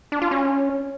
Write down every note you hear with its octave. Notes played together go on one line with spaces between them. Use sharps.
D4
F4
C#4